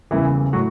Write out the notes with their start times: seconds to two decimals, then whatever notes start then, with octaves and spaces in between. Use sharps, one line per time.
0.11 F#1 E2 C#3 E3 G3 E4
0.53 A2 F#3 F#4